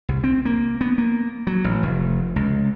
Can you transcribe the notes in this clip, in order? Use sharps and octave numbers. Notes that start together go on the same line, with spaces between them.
C2
C4
A#3
B3
A#3
F#3
A1
F1
C#2